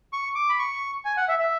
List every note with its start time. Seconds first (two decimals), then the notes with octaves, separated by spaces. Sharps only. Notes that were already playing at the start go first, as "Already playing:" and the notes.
0.13 C#6
0.35 D6
0.49 B5
0.59 C#6
1.05 G#5
1.17 F#5
1.28 E5
1.39 E5